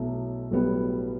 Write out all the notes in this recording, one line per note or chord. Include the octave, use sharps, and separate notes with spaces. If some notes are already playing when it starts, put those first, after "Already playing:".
Already playing: B1 B2 F#3 A3 E4
B1 A2 G3 B3 F#4